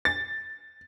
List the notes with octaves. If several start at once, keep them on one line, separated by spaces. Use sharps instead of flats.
A6